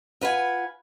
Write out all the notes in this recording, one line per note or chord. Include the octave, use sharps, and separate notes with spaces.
F4 B4 F#5 G#5